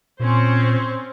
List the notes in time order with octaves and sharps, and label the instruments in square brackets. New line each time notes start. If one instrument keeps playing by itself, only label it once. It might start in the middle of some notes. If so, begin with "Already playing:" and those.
[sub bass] A#2 [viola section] C4 C#4 C5